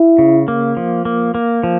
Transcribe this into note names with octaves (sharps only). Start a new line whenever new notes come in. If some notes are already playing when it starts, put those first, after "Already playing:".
Already playing: E4
C#3
A#3
F3
A#3
A#3
F3